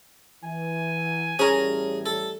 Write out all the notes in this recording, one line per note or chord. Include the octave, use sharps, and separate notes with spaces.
E3 G#5
A1 A2 G3 C#4 G#4 A#4
A4